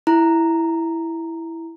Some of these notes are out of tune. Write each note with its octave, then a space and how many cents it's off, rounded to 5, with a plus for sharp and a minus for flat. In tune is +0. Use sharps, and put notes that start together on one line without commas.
E4 +0 A#5 -5